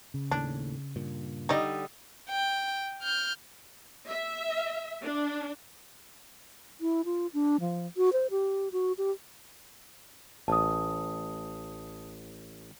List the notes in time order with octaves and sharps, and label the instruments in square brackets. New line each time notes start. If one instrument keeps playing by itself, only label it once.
[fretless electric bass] C#3
[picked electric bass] D#2 A2 [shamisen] D4
[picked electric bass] G2 A#2
[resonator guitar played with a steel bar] D3 G3 D#5 [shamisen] D#4 D5
[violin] G5
F6 G6
[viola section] E5
D4
[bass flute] E4
F4
D4
F3
F#4
C5
G4
F#4
G4
[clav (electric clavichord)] A1 [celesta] A5 D#6